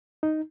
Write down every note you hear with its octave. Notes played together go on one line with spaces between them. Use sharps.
D#4